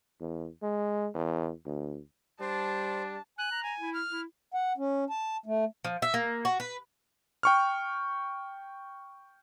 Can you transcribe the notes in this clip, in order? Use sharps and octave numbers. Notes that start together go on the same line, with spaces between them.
E2
G#3
E2
D2
G3 D4 C5 A5
G#5 F#6
A#5
G#5
E4
F6
E4
F#5
C#4
A5
A3
F3
E5
A#3
F#4
B4
G5 C#6 F6